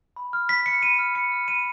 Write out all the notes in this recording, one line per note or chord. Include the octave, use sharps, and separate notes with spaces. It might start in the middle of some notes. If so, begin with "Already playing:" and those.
B5
F6
B5 B6
F6 C#7
B5 D#7
F6
B5 C#7
F6
B5 D#7